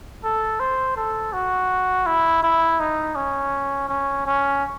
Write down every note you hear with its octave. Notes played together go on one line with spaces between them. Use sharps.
A4
C5
A4
F#4
E4
E4
D#4
C#4
C#4
C#4